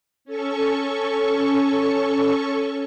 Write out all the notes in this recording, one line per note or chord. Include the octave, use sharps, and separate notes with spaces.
C#4 A4 C#6